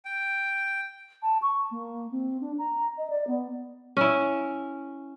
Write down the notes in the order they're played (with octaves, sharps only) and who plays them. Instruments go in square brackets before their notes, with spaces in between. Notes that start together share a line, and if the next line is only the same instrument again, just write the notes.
[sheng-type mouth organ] G5
[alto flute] A5
C#6
A#3
C4
D4
A#5
D#5
D5
B3
[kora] C#4 E4